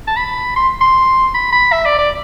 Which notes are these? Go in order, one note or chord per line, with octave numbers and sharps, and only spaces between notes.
A5
B5
C6
C6
B5
B5
E5
D5
D5